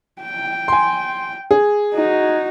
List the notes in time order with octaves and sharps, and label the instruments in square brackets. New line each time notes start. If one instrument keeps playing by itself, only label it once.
[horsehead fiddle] G5
[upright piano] G#5 C6
G#4
[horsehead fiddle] D#4 F#4